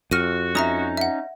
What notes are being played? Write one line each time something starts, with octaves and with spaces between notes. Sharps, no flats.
F2 F#4 F6 A#6 D#7
C#4 D#4 E5 A#5 D#6
E5 F#5